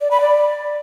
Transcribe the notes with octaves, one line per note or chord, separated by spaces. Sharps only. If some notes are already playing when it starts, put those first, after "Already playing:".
D5
B5
D5